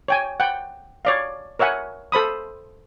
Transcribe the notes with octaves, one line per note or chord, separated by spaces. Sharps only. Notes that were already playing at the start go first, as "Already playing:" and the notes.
C#5 G5 G#5
F#5 G5
C#5 D5 F5
A#4 C#5 E5 F#5 G#5
A4 C5 B5 D#6